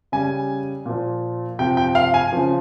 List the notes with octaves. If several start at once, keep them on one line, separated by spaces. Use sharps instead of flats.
C#3 G3 G#5
A#2 F3
C3 F3 G5
G5
F5
G#5
C#3 F3